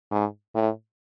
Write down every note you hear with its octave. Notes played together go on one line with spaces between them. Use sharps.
G#2
A2